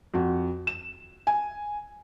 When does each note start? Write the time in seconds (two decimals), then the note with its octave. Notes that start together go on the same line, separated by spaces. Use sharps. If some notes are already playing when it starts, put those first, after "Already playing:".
0.14 F2 F#4
0.67 E7
1.27 G#5